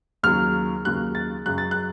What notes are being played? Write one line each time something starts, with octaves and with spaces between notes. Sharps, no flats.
D#2 C#3 F#3 A#3 F6
D#2 C#3 F#3 A#3 F#6
A6
F#2 C#3 F#3 F#6
A6
F#6